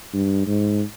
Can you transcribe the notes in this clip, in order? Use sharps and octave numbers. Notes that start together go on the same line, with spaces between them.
G2
G#2